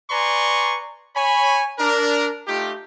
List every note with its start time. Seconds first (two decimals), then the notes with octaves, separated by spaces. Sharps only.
0.10 B4 D5 G#5 A#5 C6 C#6
1.15 C#5 G#5 B5
1.79 D4 A#4
2.47 A3 D#4 F4 G4